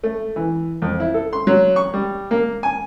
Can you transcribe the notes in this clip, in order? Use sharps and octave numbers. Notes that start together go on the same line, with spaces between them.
A3
E3
F2
E4
A4
C6
F#3
C#6
G3
A#3
G#5